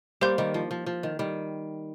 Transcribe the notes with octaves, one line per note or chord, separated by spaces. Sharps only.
G3 A#3 G4 C5 F5 C6 G6
D#3 G3
F3
F3
F3
D#3
D#3 G3